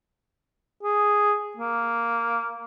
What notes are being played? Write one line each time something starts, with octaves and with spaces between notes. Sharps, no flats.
G#4
A#3